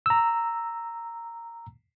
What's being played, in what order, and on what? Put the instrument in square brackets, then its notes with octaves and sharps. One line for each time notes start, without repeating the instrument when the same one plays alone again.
[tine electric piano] A#5 E6